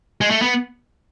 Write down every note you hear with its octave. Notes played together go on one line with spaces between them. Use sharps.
G#3
A3
B3